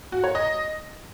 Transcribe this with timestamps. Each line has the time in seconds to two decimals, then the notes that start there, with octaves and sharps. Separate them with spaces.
0.12 F#4
0.24 C#5
0.35 D#5